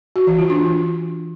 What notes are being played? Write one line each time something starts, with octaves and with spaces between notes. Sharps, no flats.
F#4
E3
F4
D4